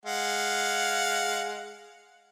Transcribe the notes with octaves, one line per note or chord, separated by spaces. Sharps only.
G#3 F5 F#5